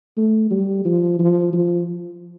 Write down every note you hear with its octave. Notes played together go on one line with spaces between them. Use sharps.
A3
G3
F3
F3
F3